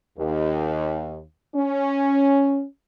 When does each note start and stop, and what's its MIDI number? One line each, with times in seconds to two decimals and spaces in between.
0.18 1.19 39
1.55 2.63 61